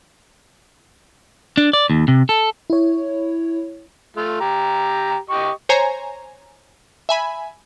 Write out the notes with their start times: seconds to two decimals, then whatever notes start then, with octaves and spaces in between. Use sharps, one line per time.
1.57 D4
1.73 D5
1.90 D#2
2.08 C3
2.29 A4
2.70 E4 C#5
4.17 A3 F4
4.41 G4 A#5
5.30 G4 D#5 C#6
5.69 C5 C#5 G#5 A#5
7.09 E5 G#5 B5